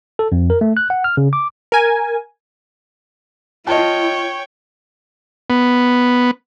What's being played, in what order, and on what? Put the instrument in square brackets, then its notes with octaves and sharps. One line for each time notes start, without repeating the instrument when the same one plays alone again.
[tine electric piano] A4
F2
A#4
A3
F#6
F#5
F6
C#3
D6
[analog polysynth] A#4 G#5
[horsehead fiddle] F4 [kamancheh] C#5 G5 [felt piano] D#5 A5
[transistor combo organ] B3